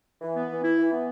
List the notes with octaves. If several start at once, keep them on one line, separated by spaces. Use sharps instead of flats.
E3
B3
E3
E4
E3
B3